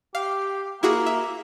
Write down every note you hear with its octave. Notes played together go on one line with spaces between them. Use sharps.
G4 F5
A#3 E4 F#4 G#4
E5